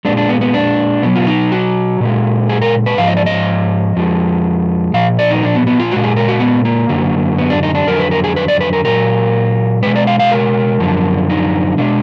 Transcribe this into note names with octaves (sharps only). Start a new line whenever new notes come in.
A#2 G#3 D4
D4
B3
B3
D4
B2 F#3 B3
F4
D#4
F#4
A#2 G#3
G#4
A#4
B4
G#2 F3 F5
D#5
D5
D#5
F2 F3 G#3
A#2 F3 F5
D5
D#4
D4
B3
B3
F4
A#2 G#3 F#4
G#4
A#4
F#4
B3
A#3
F#2 D3 F#3
B3
D4
D#4
D4
F2 D3 F#3 A#4
B4
A#4
G#4
B4
D5
B4
A#4
A#2 F#3 A#4
B2 G#3 B4
D5
F5
F5
A#4
F#2 D3 F3
D#4
B2 G#3 D4